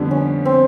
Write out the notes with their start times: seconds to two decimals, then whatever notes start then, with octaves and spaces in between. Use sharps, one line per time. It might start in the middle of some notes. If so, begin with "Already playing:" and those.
Already playing: F2 D3 G3 B3 D4
0.11 C#4
0.45 C4